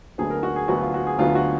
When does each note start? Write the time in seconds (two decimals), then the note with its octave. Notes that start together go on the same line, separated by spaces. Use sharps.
0.18 D2 D3 F#3 B3 G#4
0.30 A#4
0.43 F#4
0.56 G#4
0.68 D2 D3 F#3 B3 F#4
0.81 F4
0.94 F#4
1.07 G#4
1.18 D2 D3 F#3 B3 F4
1.35 F#4